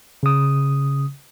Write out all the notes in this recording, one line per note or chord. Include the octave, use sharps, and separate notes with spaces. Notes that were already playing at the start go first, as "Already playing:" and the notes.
C#3 D#6